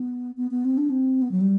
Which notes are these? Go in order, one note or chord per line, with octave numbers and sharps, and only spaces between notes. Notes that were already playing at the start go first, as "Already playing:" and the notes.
Already playing: B3
B3
B3
C4
D4
C4
B3
F#3
G3